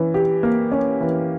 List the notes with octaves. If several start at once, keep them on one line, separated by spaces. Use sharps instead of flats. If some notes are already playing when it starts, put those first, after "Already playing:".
Already playing: E3 C#4
G4
A#3
C#4
E3